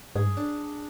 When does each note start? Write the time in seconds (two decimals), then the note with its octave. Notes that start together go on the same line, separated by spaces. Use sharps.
0.15 G#2 G#4
0.26 G2
0.37 D4